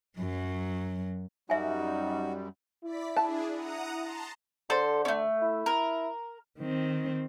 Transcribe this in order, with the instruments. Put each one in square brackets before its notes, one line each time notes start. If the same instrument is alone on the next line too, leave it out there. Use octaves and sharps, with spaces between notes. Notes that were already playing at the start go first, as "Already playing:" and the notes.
[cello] F#2 F#3
[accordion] F#2 G3 [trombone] D#4 [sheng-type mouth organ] F#4 [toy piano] E5 G#5
[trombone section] E4 [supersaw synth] D5 B6
[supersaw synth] D4 G#4 [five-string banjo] A5
[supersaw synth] F#5 A#5 D#6
A5 A#5 C6
[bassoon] D3 [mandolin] A4 C5
[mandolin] A3 C#4
[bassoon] E4
[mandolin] A#4
[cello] D#3 C4